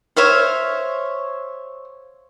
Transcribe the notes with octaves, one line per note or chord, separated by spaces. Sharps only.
C5 C#5 E5 F5